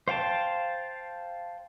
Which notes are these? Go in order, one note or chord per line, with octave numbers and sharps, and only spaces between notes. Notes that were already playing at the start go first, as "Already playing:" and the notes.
C5 F5 G5 A5